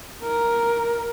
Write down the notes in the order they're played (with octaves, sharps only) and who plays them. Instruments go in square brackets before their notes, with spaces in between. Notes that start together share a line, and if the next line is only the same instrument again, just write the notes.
[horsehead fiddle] A#4